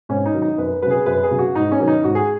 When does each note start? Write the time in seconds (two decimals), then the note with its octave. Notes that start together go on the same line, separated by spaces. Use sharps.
0.09 G#2 C#4
0.26 D#4
0.34 D#3 F#3
0.42 D#4
0.58 F#2 B4
0.82 F#3 B4
0.86 C#3 G#4
1.06 F#2 B4
1.23 G#4
1.31 C#3 F#3
1.39 F#4
1.55 G#2 D#4
1.72 C#4
1.80 D#3 F#3
1.88 D#4
2.04 G#2 F#4
2.15 G#4